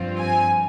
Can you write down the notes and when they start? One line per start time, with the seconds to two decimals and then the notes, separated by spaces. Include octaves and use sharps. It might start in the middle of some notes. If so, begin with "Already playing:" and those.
Already playing: G2 F3 C4 F4
0.19 G#5